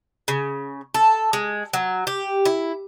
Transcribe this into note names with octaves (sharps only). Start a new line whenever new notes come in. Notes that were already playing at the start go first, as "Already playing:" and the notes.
C#3
A4
G#3
F#3
G4
E4